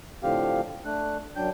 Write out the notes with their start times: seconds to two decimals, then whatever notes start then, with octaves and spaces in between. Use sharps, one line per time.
0.23 A2 D3 F3 C4 G4 F5
0.85 A3 D4 F#6
1.36 F#2 F#3 D4 G5 G6